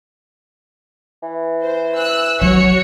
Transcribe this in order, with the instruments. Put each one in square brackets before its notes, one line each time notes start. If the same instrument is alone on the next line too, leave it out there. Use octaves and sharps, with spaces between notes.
[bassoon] E3
[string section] C5
E6 F#6
[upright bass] F#3 [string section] F#4 C#5 C#7